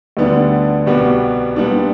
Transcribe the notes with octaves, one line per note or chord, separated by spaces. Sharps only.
D2 D3 G3 B3 D4
C2 B2 G3 B3
A#2 G3 B3 D4